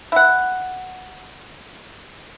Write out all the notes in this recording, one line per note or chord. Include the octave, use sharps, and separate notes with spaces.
E4 F#5